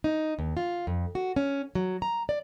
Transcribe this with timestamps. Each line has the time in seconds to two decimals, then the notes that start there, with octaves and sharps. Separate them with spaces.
0.04 D#4
0.39 D#2
0.57 F4
0.87 F2
1.15 F#4
1.36 C#4
1.75 F#3
2.02 A#5
2.29 D5